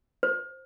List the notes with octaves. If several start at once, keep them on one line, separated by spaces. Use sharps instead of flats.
C5